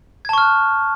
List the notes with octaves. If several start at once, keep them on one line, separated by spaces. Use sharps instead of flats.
A5 C#6 F6 F#6 G#6